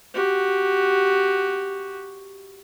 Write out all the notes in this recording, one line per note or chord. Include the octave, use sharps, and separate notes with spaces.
F#4 G4